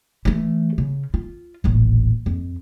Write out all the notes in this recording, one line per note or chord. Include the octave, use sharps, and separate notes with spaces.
E3 A3
C#3
F4
D#1 A1
F2